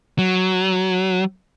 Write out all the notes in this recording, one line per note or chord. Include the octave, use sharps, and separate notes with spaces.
F#3